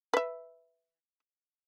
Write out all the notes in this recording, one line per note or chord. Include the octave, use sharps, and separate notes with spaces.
B4 E5